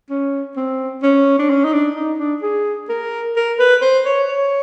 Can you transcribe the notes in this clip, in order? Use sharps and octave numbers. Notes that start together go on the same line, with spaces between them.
C#4
C4
C#4
D4
C#4
D#4
D4
D#4
D4
G#4
A#4
A#4
B4
C5
C#5
C#5